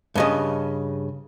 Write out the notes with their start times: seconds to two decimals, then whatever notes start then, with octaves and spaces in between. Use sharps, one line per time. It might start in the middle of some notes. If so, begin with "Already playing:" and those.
0.15 G2 C#3 D#5